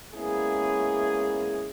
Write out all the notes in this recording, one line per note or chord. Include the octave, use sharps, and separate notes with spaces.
G#3 A#3 B3 C#4 E4 G#4